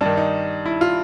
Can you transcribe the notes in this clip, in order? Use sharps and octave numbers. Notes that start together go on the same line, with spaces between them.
G2 D#3 D4
D#4
E4
F4